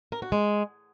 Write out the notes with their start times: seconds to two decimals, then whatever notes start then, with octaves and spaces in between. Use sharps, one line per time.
0.12 A#4
0.22 F#4
0.32 G#3